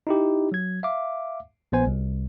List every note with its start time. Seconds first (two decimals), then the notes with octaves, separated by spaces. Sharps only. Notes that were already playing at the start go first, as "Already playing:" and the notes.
0.07 D#4 E4 G4
0.52 F#3 G#6
0.83 E5 F5 D6
1.72 A#1 B3 C5 G#5
1.86 C2